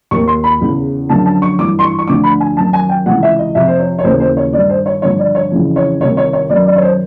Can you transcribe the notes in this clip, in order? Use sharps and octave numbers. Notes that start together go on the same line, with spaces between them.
D#2 D#3 C#6
C6
B5
E2 C#3 E3
F#2 D3 F3 A5
A5
C#6
G2 E3 D6
C6
C#6
C#6
D2 D3 F3 D6
B5
G#5
F#2 D#3 A5
G#5
G5
C#2 C3 E3 F#5
E5
D#5
F2 C3 F3 E5
C5
C#5
C#5
D#2 C#3 E3 C5
C5
C#5
G2 D#3 D5
C5
C#5
G2 D3 F3 C#5
D5
C#5
F2 C#3 E3
C#5
C2 C3 D#3 C#5
C#5
C#5
F#2 D#3 D5
D5
C#5
C5